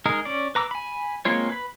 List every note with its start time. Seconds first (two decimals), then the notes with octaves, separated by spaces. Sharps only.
0.06 G#3 D#4 G#4 A#4
0.25 C#4 D5
0.55 B4 A#5 D6 E6
0.71 G#5 B5
1.25 G#3 A#3 C4 F4 C#5
1.49 B4 B5